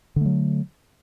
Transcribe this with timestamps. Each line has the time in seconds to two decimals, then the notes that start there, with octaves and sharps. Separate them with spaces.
0.16 D3
0.21 A3
0.25 F#3